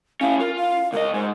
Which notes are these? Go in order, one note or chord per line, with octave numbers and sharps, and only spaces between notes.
C#4 E4 F5
F4 A#4
F5
C#2 A#4 D#5
G#2 G#3 C5